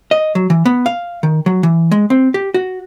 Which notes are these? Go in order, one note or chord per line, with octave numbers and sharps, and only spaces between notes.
D#5
F#3
E3
B3
F5
D#3
F#3
E3
G#3
C4
G4
F#4